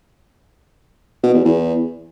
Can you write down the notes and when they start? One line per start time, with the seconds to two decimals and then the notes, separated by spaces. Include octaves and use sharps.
1.23 B2
1.34 E2
1.45 E2